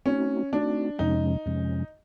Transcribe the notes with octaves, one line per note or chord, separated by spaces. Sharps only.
A3 C4 C#4 D#4 F#4
A3 C4 D4 D#4 F#4
F2 C3 F3 G#3 C#4 D#4
F2 C3 F3 G#3 C#4